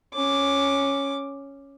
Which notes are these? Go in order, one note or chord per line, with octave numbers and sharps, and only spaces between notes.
C#4 D6